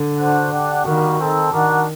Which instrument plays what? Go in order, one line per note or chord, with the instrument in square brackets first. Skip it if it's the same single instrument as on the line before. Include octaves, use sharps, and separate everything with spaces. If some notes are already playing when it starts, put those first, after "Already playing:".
Already playing: [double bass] D3
[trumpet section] D4 F#4 C5 F#5
D4 G4 D5 F#5
[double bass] D#3 [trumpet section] G3 A#3 F#4
[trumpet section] C4 D#4 A4
[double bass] D#3 [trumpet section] D4 F#4 A#4 D5 F#5